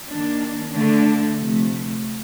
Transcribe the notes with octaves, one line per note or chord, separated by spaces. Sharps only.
D#3 A#3 D4
D3 A3 D4
C3 F3 A3